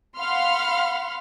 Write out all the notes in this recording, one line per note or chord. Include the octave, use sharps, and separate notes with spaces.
F5 F#5 B5 C6 F6